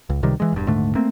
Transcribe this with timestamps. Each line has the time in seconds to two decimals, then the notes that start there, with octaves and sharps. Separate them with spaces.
0.09 C#2
0.23 C#2 C3 D#3 G3
0.40 E3 G#3
0.53 E1 G2
0.67 D#1 G#2 D3 A3
0.95 A3 A#3 C4